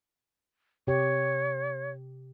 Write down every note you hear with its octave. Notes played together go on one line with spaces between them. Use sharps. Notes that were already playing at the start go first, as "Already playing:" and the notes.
C3 G4 C#5